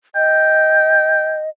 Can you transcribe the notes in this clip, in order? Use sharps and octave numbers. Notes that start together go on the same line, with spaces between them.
D#5 G5